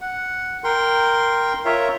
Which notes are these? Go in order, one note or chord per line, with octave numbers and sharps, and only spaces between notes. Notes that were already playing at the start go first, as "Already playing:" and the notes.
F#5
A#4 G5 C6
F4 A#4 C#5 E5